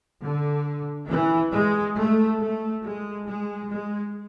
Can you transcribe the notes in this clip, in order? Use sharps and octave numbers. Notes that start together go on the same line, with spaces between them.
D3
E3
G#3
A3
A3
G#3
G#3
G#3